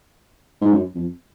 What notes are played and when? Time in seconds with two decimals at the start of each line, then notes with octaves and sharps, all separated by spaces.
0.62 G#2
0.72 F#2
0.95 F2